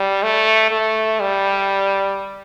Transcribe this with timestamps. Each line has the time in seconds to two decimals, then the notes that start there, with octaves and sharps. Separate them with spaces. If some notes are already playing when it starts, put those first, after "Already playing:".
Already playing: G3
0.23 A3
0.71 A3
1.21 G3